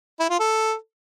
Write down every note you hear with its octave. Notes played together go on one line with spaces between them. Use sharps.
E4
F4
A4